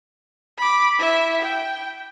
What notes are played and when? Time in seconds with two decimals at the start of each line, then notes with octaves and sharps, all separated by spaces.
0.58 B5 D6
0.99 E4 E5
1.42 G5